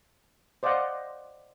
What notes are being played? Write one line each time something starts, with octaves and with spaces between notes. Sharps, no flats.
C5 D5 D#5 F5 F#5